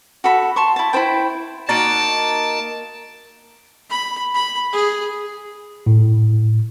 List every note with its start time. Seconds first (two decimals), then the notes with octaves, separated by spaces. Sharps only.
0.24 F#4 A4 B5
0.56 A5 C6 C#6
0.76 E4 A5
0.93 E4 F4 C5 G5
1.69 A#3 D#4 F#4 A5 A6 D7
3.90 B5
4.34 B5
4.72 G#4
5.86 A2